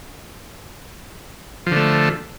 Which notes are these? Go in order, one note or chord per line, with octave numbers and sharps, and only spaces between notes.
D3 F3 A3